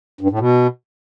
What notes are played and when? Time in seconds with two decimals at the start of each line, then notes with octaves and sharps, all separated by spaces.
0.21 G2
0.30 A2
0.39 B2